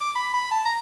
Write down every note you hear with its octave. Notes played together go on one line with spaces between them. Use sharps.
D6
B5
B5
A5
A#5